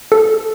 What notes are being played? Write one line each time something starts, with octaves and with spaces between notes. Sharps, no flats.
A4